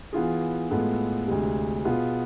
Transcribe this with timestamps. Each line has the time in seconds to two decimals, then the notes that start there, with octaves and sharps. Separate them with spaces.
0.13 E3 B3 F4 G#4
0.70 A2 G#3 B3 F4 A4
1.28 D2 C3 G#3
1.85 B2 B3 F4 G#4